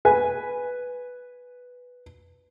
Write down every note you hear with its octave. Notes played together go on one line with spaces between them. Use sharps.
B4 G#5